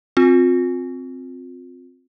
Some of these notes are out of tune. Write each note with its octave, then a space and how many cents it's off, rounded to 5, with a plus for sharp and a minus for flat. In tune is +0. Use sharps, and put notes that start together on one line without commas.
C4 +0 F4 +35